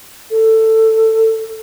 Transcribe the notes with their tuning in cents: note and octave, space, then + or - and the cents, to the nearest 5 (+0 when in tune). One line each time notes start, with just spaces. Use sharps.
A4 +15